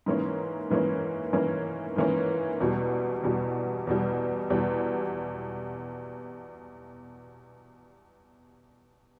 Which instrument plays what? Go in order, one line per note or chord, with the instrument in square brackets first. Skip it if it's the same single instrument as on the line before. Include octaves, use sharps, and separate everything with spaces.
[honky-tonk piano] G#2 E3 A#3 C#4
G#2 E3 A#3 C#4
G#2 E3 A#3 C#4
G#2 E3 A#3 C#4
E2 B2 G3
E2 B2 G3
E2 B2 G3
E2 B2 G3